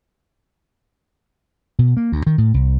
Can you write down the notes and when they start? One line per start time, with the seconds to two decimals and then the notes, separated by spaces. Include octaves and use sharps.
1.79 B2
1.97 A#3
2.12 D2
2.27 D#3
2.38 A2
2.54 C2